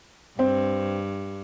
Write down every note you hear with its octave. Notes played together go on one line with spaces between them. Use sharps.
G2 C4